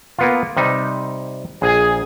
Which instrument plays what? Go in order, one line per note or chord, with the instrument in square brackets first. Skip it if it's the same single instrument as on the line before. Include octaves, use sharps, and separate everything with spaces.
[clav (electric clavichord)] A#3 B3 F4
C3 G3 D#4
[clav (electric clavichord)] A#1 [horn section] G#4